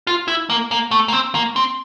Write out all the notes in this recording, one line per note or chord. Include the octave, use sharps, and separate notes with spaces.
F4
E4
A#3
A#3
A3
A#3
C4
A#3
C4